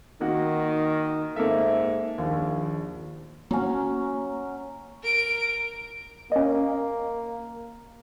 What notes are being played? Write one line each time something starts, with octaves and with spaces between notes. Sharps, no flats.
D#3 A#3 F#4
G#2 A#3 A4 E5
A#1 D#2
F#3 A#3 C#4
A#4 D7
A#3 C#4 D#5